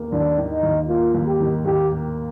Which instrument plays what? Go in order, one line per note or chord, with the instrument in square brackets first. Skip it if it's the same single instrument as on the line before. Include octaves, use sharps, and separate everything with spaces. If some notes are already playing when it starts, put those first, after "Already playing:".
Already playing: [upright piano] D#2 D#3 A#3
[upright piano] D#2 [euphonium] D4
[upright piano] D#3
[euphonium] D#4
[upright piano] D#2
[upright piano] A#3 [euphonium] F4
[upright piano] D#2
[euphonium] G4
[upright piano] D#3
[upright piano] D#2 [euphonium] G4
[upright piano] A#3